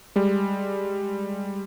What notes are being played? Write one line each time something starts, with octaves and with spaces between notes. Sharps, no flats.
G3 G#3